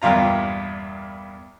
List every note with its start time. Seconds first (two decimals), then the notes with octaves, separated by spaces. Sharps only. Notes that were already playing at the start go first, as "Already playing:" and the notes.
0.02 E2 G2 A#2 F4 A#5